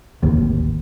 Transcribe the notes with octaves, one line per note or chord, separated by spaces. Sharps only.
D1 G#1 D#2